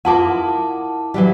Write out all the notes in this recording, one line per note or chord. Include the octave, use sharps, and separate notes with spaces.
E4 F4 A#4 F#5 A5 D6
E3 F#3 G3